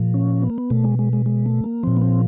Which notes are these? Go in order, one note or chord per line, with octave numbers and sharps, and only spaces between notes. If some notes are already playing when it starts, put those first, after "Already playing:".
Already playing: A#2 F3
C#4
B3
A#3
B3
B2 A3
G#3
G#3
G#3
G#3
A3
A#3
A#2 F3 C4
B3
C4